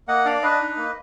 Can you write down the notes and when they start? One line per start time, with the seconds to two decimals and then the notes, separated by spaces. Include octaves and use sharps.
0.08 A#3 D#5 F#5
0.25 D4 D5 F5
0.42 D4 B4 D#5
0.60 D#4
0.77 A#3